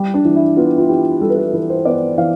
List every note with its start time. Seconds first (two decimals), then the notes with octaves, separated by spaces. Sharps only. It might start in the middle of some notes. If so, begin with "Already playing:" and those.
Already playing: G3
0.14 D4
0.25 E3
0.36 E4
0.57 B3 F4
0.78 F4
0.89 E3 G4
1.21 G3 A4
1.30 B4
1.37 A4
1.53 E3 B4
1.70 C5
1.85 B3 D5
2.17 E3 F5